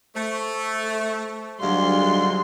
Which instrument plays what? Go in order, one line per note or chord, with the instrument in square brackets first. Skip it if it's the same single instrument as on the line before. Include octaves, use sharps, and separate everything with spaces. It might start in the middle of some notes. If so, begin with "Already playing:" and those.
[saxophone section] A3 [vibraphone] C5 C#6
[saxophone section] D2 G#2 [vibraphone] F#3 D4 F5 [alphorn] G3 [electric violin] C6